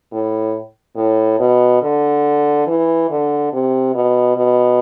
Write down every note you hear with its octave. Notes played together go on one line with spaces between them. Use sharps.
A2
A2
B2
D3
E3
D3
C3
B2
B2